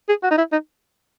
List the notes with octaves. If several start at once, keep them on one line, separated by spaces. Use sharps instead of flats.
G#4
F#4
D#4
E4
D#4